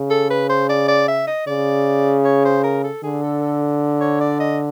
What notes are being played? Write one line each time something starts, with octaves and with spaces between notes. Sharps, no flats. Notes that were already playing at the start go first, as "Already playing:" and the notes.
Already playing: C#3
A4
B4
C5
D5
D5
E5
D#5
C#3 D5
C#5
C5
A#4
A4
D3 G#4
A4
A4
C#5
D5
D#5